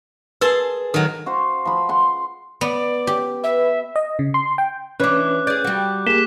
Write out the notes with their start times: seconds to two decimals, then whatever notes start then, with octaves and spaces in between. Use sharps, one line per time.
0.41 G#4 A#4 B4 A5 C6
0.94 D#3 F#3 A4
1.26 F#4 C5 F5
1.65 F3 B5
1.89 F#5 C6
2.61 B3 D5
3.07 G4
3.43 B4 E5
3.96 D#5
4.19 C#3
4.34 C6
4.58 G5
5.00 E3 C#4 D4 B4 C#5 D6 F#6
5.47 G#4 D5 G6
5.64 G3 F#4
6.07 A#3 G4 G#4 B6 E7 G7